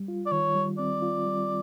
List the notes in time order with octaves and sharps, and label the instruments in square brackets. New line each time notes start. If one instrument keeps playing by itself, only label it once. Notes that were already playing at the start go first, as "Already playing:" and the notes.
Already playing: [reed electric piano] G3
F4
[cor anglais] D5
[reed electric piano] D#3 [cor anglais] C#5
[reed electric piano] G3
[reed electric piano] C4 [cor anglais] D5
[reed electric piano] F4
G3